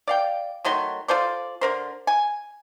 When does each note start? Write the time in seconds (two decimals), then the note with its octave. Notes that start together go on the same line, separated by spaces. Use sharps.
0.08 D5 F5 G5
0.65 D#3 F#3 A3 C6
1.08 F4 A4 C5 D5
1.61 D3 A#4 C5
2.07 G#5